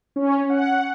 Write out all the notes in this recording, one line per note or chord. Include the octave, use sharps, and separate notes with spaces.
C#4
F#5